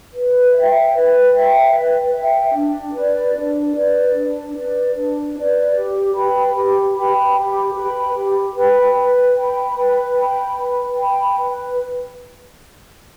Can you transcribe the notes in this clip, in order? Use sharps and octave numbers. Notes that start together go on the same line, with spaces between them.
B4
E5 G5
B4
E5 G5
B4
E5
G5
D4
B4 D5
D4
B4 D5
D4
B4 D5
D4
B4 D5
G4
B4 G5 B5
G4
B4 G5 B5
G4
B4 G5 B5
G4
B4 G5 B5
B4
G5 B5
B4
G5 B5
B4
G5 B5
B4